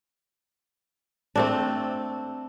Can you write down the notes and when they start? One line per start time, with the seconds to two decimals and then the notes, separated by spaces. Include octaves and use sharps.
1.36 A3 C4 D4